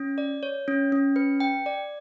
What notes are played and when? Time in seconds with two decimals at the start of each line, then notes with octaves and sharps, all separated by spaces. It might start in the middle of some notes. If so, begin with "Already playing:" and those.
Already playing: C#4
0.18 D5
0.43 C#5
0.68 C#4
0.92 C#4
1.16 B4
1.40 G5
1.66 D5